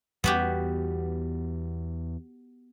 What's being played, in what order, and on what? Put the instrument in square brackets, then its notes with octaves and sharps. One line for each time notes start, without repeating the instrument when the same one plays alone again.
[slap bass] E2 G3 [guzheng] B3 F#4 G4